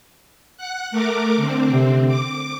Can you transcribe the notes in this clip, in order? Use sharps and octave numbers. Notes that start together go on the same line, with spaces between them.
F#5 F#6
A3 A#4 D6
D3 C4
C3
D6